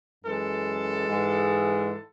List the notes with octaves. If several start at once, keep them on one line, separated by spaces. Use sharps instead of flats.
F#2 E3 G#3 A4
G#2 E3 G#3